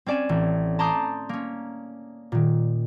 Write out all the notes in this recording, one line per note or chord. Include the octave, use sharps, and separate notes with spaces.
C4 C#4 D5 G#5 E7
A1
A5 A#5 C6 D6 D#6 G6
A#3 C#4
A#2 D#3